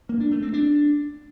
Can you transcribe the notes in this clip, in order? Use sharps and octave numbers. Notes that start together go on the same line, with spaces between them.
A#3
D4
A3
C4
D4